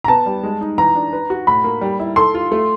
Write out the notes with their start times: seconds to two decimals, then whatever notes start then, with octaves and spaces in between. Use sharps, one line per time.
0.04 A#5
0.08 B3 A5
0.26 G3
0.43 G#3
0.61 D#4
0.78 E3 A#5
0.95 D4
1.13 B4
1.30 F#4
1.47 A2 B5
1.64 A#3
1.81 G3
2.00 E4
2.16 A4 C6
2.34 F4
2.52 A3